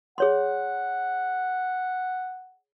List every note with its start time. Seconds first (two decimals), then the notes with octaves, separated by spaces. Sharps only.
0.18 G#4 C#5 F#5 C6